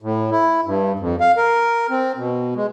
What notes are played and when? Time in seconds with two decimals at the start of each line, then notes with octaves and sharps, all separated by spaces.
0.01 A2
0.31 E4
0.65 G2
0.99 F2
1.20 F5
1.37 A#4
1.90 C4
2.17 B2
2.56 G#3